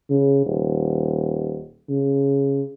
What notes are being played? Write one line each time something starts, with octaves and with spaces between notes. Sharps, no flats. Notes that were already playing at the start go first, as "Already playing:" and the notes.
C#3
D#1
C#3